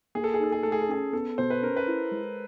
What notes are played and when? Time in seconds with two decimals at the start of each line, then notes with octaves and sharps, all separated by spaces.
0.15 A#3 G#4
0.24 A4
0.34 G#4
0.39 D#4 A4
0.52 G#4
0.63 A3 A4
0.72 G#4
0.82 A4
0.89 C#4 G#4
1.13 B3 A4
1.38 B2 C5
1.50 B4
1.62 C#4 A#4
1.77 B4
1.87 E4
2.11 G#3